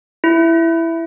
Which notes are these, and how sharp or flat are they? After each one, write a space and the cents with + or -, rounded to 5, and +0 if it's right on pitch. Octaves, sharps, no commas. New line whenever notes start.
E4 +5